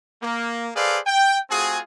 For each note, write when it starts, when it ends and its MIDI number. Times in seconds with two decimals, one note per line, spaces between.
0.22 0.68 58
0.75 0.99 68
0.75 0.99 69
0.75 0.99 71
0.75 0.99 72
0.75 0.99 74
0.75 0.99 77
1.06 1.38 79
1.50 1.79 57
1.50 1.79 60
1.50 1.79 65
1.50 1.79 66
1.50 1.79 68